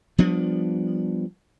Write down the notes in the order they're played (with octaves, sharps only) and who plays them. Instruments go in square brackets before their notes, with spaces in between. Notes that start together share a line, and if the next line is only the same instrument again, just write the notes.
[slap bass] F3 G3 B3 D4